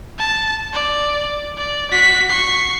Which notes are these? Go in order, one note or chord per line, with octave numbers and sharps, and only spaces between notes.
A5
D5
D5
F#4 B6
C#6 C7